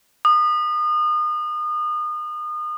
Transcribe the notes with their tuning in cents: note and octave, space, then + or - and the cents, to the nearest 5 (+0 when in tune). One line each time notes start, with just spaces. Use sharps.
D#6 -30